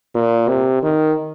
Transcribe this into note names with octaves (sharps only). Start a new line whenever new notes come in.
A#2
C3
D#3